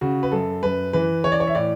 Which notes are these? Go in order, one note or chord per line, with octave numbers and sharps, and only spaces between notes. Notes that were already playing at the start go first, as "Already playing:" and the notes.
C#3 F#4
B4
F#2 A4
F#2 B4
E3 B4
E3 C#5
D5
C#5
E5
A2 D5